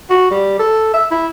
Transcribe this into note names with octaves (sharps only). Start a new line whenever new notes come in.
F#4
G3
A4
E5
E4